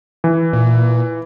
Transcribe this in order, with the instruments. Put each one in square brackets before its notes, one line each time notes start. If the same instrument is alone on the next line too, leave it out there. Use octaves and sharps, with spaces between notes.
[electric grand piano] E3
[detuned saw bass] A#2